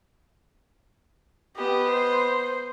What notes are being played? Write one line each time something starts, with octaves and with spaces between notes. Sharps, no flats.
B3 G4 D#5
C5